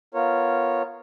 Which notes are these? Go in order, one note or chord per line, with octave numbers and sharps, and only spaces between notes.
B3 F4 A#4 C#5